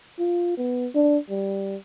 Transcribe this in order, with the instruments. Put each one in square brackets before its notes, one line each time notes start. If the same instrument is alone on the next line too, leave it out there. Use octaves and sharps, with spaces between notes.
[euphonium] F4
B3
D4
G3